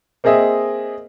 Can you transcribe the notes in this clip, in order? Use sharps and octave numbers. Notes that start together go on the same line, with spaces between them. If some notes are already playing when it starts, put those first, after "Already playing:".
A#3 C4 G#4 D#5 E5